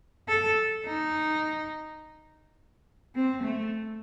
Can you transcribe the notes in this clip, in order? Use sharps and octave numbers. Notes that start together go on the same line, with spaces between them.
A4
D#4
C4
A3